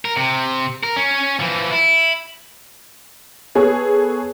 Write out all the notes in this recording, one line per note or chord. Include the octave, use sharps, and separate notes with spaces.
A#4
C3
A#4
C#4
E3 F3
E4
B3 G#4 A4 C#5